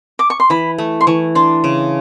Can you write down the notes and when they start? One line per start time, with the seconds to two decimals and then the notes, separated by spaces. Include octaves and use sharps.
0.19 D6
0.30 C#6
0.40 C6
0.50 E3 B5
0.78 A3
1.01 C6
1.07 E3 C#6
1.35 D4 C6
1.64 C#3